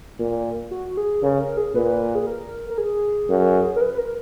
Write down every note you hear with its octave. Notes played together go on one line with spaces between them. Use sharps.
A#2
F#4
G#4
C#3 A#4
A#4
G#4
A#2 B4
G#4
A#4
A#4
G#4
F#2
A#4
B4
B4
A#4